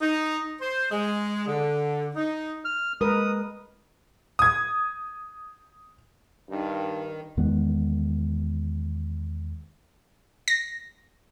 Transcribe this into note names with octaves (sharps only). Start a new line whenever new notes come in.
D#4
C5
G#3
D3
D#4
F6
G#3 A#4 B4 D#6
D#6 G#6
G2 D#3
E2 D#3 G#3 B3
A#6